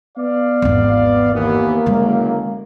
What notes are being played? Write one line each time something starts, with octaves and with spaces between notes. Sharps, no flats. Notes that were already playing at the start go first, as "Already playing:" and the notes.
B3 D5 F5
G#1 E2
D#2 E3 A#3 B3
F#1 B1 F#2 D3 G#3